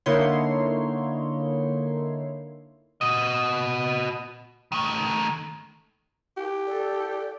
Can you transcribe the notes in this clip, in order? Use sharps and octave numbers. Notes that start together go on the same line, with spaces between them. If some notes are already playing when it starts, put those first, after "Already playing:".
D3 A#3 D#4 E4 C#5 C6
F#4 D#5
D#3 A3
G4
A4 D5